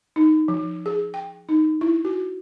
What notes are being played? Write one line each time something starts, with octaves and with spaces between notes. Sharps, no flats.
D#4
F3
G#4
G5
D#4
E4
F#4